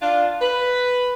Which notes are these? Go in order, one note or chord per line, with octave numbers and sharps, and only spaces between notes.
D4 F4
B4